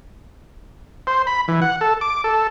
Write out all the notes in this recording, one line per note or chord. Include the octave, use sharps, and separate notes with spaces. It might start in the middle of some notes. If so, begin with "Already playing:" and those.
C5
B5
E3
F#5
A4
D6
A4